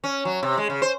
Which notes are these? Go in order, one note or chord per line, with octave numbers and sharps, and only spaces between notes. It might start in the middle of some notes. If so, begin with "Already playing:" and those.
C#4
F#3
C3
G#3
C#3
C5